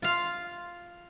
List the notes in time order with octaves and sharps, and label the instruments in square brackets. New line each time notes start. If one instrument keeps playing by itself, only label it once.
[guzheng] F4 F5